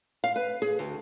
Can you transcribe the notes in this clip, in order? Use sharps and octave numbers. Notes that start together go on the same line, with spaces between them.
F5
B4
G#4
D2